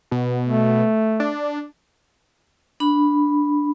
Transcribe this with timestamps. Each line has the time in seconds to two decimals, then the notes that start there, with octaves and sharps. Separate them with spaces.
0.11 B2
0.46 A3
1.20 D4
2.80 D4 B5